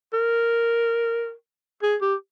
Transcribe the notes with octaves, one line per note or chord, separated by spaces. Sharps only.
A#4
G#4
G4